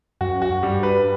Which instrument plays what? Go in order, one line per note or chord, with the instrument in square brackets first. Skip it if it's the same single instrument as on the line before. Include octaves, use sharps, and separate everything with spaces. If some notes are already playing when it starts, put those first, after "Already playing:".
[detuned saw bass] F#2 [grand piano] F#4
[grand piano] F#4
[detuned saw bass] G2 [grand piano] G3
[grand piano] B4